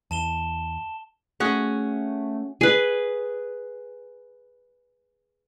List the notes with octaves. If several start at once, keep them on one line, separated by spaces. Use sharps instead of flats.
E2 A5 E7 G7
A3 C#4 F#4 G#4
G#4 B4